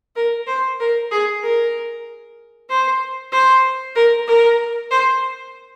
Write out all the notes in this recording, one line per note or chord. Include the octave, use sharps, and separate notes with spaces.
A#4
C5
A#4
G#4
A#4
C5
C5
A#4
A#4
C5